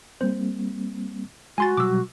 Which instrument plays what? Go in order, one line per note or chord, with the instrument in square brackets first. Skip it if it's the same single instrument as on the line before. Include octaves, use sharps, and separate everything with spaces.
[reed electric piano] G3 A#3 C4 [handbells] C5
[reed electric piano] G#3 [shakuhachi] F#4 [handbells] G#5 C6 A6
[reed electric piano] B2 F#3 G3 [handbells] D6 E6